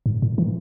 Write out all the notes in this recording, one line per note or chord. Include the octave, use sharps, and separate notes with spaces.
G#2
A2
E3